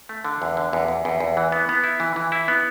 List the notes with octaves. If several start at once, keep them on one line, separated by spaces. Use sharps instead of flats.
A3
D3
E2
D3
E2
E2
E2
E2
E3
B3
B3
E4
E3
E3
E4
B3